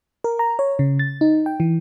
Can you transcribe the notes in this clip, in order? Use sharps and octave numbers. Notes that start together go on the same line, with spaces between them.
A#4
A#5
C#5
C#3
A6
D#4
G5
E3